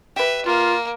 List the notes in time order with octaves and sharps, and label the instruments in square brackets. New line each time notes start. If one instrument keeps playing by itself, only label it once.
[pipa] G4 B4 [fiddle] E5
[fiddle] A#3 [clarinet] F4